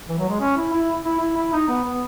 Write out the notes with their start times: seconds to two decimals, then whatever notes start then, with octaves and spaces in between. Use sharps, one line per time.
0.09 E3
0.18 F#3
0.29 G#3
0.41 C#4
0.57 E4
0.73 E4
1.05 E4
1.20 E4
1.37 E4
1.53 D#4
1.68 B3
1.85 B3